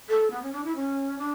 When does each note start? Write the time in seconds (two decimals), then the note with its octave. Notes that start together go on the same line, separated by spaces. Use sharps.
0.09 A4
0.31 B3
0.42 C#4
0.52 D4
0.64 E4
0.75 C#4
1.18 D4